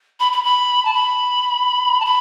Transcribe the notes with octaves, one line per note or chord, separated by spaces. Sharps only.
B5
B5
B5
A5
B5
A5
B5